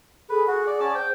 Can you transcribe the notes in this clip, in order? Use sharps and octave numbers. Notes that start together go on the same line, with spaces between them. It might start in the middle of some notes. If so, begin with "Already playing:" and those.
G#4 A4 B4
F#4 F#5
D5
C#4 D5 A5
C5 G5